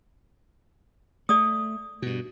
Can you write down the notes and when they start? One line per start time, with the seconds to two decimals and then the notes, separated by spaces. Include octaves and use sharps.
1.29 A3 D5 D#6
2.02 G2 B2